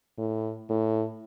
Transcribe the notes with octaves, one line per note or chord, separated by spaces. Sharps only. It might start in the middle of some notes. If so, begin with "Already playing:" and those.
A2
A2